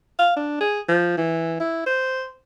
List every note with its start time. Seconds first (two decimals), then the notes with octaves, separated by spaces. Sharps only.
0.19 F5
0.36 D4
0.60 G#4
0.89 F3
1.17 E3
1.60 E4
1.87 C5